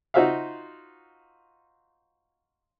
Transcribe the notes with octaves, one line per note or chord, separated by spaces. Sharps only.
D#4 F4 F#4 C5 E5 F5